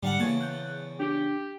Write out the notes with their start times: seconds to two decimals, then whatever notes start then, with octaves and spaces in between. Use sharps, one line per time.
0.03 G#2 D3 G3 F5 F#5 A5
0.20 E2 C#3 A#3 A5 G#6
0.41 F#6 G6
1.00 D4 G4